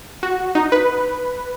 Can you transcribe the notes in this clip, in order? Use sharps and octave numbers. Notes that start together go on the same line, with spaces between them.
F#4
D#4
B4